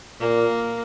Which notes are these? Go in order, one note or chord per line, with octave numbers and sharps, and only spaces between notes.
A#2 A#3